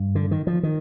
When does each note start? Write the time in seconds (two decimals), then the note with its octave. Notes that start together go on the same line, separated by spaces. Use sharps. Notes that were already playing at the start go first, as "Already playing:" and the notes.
Already playing: G2
0.15 D3
0.31 D#3
0.47 F3
0.63 D#3